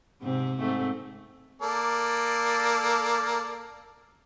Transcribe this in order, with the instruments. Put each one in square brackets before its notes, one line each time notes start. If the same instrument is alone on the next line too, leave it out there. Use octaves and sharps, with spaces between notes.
[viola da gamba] G#2 C3 C4
G#2 A3 C4
[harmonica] A#3 A4 D5